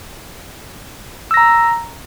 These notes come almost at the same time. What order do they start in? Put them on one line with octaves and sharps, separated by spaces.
E6 A#6 A#5